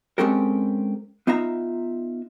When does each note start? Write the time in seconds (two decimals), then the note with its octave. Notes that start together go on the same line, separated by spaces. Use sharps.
0.18 G#3 C4 C#4 G4 A4 A#4
1.27 B3 D#4 F4 E5 A#5